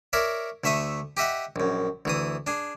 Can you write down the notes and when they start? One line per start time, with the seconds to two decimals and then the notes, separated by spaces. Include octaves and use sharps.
0.13 A#4 C#5 D5 E5
0.64 D2 A3 E5 C#6 D#6
1.17 G4 D#5 E5 F#5
1.56 A#1 F#2
2.05 D2 E3 D#6
2.47 D4 G#4